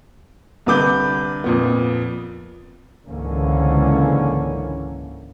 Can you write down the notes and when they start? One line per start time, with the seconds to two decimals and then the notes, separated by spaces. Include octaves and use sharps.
0.66 C2 D3 B4 D6 G6
1.44 F2 A#2 B3
3.08 C#2 G#2 D3 E3 A#3 C#4